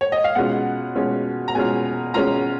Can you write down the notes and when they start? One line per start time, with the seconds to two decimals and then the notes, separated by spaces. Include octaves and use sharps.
0.01 C#5
0.12 D#5
0.24 F5
0.35 B2 G#3 C#4 F4 F#5
0.95 B2 G#3 C#4 F4
1.48 A#5
1.55 B2 G#3 C#4 F4 G#5
2.14 B2 G#3 C#4 F4 A#5